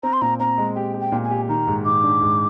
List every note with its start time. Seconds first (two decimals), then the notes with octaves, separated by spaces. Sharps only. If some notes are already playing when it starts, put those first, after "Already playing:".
0.03 C4 A#5
0.13 C6
0.21 A#2 A#5
0.40 C4 A#5
0.58 G#3
0.76 G4 G5
0.94 G4
1.00 G5
1.12 A#2
1.24 G#5
1.31 G4
1.49 D#3 A#5
1.67 G#2
1.85 D#3 D6
2.04 D4
2.21 G#2